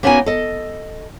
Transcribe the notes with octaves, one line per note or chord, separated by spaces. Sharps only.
A#3 B3 C#4 D#4 F#4 G#5
A4 D#5